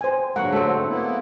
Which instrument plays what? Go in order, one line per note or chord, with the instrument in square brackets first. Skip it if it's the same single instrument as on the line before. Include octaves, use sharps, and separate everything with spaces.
[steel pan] C5 G#5
[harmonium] G#2 D3 F#3 [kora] A#3 [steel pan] F#5 C#6
[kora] A3 C4
[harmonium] A#3 B3 E4